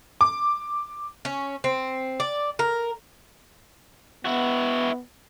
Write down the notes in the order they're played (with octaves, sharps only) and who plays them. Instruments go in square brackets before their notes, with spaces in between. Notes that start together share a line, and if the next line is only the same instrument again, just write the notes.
[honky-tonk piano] D6
[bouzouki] C#4
C4
D5
A#4
[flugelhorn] B3 [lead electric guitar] E4 F#4